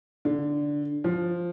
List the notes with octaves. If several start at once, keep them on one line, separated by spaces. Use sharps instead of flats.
D3
F3